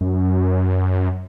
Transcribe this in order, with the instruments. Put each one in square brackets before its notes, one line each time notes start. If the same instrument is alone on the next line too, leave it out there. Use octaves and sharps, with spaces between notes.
[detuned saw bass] F#2